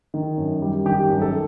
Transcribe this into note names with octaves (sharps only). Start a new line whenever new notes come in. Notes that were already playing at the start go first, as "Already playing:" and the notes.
D#3
F#2
G3
D#3 G4
F#2
A4